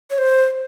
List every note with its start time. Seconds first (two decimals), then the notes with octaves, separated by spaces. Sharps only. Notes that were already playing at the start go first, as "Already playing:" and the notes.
0.10 C#5
0.18 C5